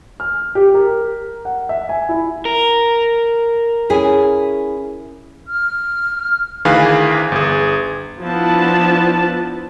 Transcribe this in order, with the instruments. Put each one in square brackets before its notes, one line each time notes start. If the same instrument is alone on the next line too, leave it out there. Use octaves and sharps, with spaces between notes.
[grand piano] F6
G4
A#4
F#5
E5
G#5
E4
[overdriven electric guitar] A#4
[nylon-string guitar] C#4 E4 G#4
[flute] F6
[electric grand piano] D2 D#3 E3 G#4 B4 F5
G1 G#4
[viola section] F3 B3 D4 E4 B4 A5